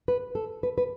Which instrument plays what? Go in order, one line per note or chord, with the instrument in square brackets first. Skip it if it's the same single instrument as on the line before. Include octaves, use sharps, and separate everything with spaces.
[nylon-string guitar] B4
A4
B4
B4